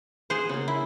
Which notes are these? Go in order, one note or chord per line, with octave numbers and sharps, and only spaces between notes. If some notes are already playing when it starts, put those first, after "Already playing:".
G#4 C5 F#5
C#3 A#3
E4